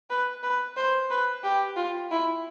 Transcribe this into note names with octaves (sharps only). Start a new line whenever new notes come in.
B4
B4
C5
B4
G4
F4
E4